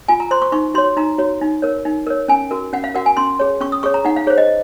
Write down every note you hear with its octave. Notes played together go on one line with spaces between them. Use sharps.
F4 G#5
A#5
C5 C6
C#6
D#4 C#6
F#4 C#5 C6
D#4 A#5
F#4 C#5
D#4
A#4 C#5
D#4
A#4 C#5
C#4 G#5
F#4 A#4
C#4 F#5
F5
F#4 A#4 F#5
G#5
C#4 C6
G#4 C#5
C#4 C#6
D#6
G#4 C#5 C#6
A#5
D#4 F#5
F5
G#4 C5 C#5
D#5